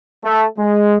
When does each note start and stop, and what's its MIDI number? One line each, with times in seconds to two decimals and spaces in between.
0.25 0.45 57
0.58 0.97 56